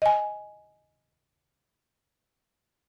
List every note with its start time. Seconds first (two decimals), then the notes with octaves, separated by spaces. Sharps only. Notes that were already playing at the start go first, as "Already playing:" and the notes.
0.02 D#5 G#5